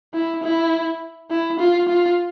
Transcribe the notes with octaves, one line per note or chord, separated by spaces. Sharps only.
E4
E4
E4
F4
F4